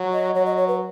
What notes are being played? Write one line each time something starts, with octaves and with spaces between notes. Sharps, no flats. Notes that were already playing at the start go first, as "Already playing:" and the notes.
Already playing: F#3
D#5
F#3 C#5
D#5
C#5
B4